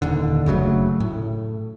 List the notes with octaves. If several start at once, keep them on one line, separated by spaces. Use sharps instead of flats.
D#1 D#2 D3
F#1 C#3 F#3 A3
A2